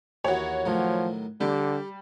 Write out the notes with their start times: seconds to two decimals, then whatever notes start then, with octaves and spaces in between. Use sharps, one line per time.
0.25 D#2 D#3 E3 F#4 C#5
0.66 A2 D#3 F3 F#3
1.41 D3 G3 G4 D5